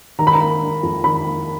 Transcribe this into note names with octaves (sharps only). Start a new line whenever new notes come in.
D#3 A#5
B5
A#5
A#3
D4
F2
D#3 B5
A#3